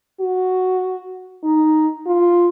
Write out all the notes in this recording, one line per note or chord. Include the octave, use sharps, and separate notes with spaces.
F#4
D#4
F4